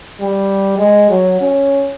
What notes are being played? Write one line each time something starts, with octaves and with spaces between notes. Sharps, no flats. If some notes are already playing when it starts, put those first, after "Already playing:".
G3
G#3
F#3
C#4